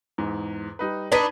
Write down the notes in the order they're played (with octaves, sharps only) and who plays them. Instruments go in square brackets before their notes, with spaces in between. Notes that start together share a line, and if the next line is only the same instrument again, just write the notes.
[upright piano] E2 G#2
G3 D#4 B4
[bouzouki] D4 D#4 B4 [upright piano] G#6 A6 D#7